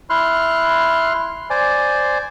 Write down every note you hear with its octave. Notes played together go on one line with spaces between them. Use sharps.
E4 C6 F6 F#6
C5 D5 G#5